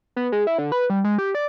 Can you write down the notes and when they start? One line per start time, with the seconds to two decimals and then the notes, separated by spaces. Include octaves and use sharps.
0.16 B3
0.32 G#3
0.47 E4
0.58 D3
0.72 B4
0.90 G3
1.04 G#3
1.18 G4
1.35 D5